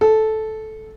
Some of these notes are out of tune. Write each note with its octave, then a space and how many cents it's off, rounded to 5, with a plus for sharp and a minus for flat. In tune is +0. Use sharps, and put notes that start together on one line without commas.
A4 -10